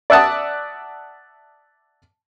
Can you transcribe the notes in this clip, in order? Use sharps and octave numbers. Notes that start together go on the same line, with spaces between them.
D5 E5 F#5 A5 D#6